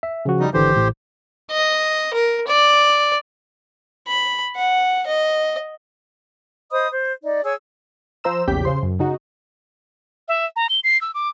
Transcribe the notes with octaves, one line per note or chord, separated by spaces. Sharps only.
E5
C#3 F3 F#4
G3 D#4
G#1 D3 E3 G4 C5
A1 A2
D#5
A#4
D5
B5
F#5
D#5
C5 D#5 B5 D#6
C5
D#4 D5
G#4 C#5 G#5 E6
F3 C5 A#5 E6 E7
A#1 E2 C#3 G4 G6 B6
C#3 C5 C6
F#2
C#3 D#4 F#4
E5
A#5
G7
C7
E6
D6